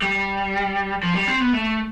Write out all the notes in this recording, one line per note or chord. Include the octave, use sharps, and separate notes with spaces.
G3
F3
G3
C4
B3
A3